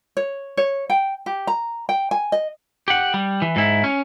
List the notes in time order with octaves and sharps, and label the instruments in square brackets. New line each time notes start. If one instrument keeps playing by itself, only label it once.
[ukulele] C#5
C#5
G5
G4
A#5
G5
G#5
D#5
[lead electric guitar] G4 F#5
G3
E3
G#2 E4
C#4